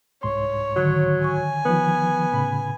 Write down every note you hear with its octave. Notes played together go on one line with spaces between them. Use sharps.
C2 G#2 C#5 C6
D3 D#3 F#3
G#5 C#6
D#3 F3 B3
A2 C#3 B5